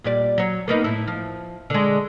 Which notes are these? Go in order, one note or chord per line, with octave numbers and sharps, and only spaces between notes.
A#2 G3 D5
F#3 C#5
A#3 B3 D#4
A2 E4
F3
D3 G#3